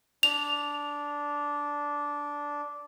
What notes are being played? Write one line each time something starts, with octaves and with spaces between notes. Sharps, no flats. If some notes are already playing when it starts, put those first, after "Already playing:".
D4 F7